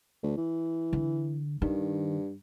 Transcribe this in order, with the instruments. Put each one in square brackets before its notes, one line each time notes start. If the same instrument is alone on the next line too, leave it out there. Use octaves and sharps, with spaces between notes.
[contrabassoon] D2
E3
[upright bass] D3
[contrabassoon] G2 [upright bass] D#3